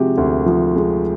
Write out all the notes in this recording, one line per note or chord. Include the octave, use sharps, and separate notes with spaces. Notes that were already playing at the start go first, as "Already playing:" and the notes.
Already playing: C3 F3 G#3 F#4 G4
D2
F3
G#3